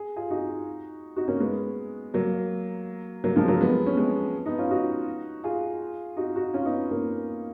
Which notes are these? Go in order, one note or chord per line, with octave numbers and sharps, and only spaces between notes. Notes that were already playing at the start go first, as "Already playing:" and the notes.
Already playing: G#4
F4 G#4
D#4 F#4
D#4 F#4
A#3 C#4
G#3 B3
F#3 A#3
F#3 A#3
F3 G#3
F#3 A#3
G#3 B3
C#4
G#3 B3
B3 D#4
C#4 F4
D#4 F#4
F4 G#4
D#4 F#4
D#4 F#4
C#4 F4
B3 D#4
A#3 C#4